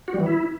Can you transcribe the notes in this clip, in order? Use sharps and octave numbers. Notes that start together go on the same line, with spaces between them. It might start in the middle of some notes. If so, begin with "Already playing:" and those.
F#4
G3
E3
E4